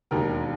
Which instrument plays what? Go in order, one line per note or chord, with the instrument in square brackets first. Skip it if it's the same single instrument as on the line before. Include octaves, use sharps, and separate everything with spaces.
[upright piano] E1 D#2 D#3 A#4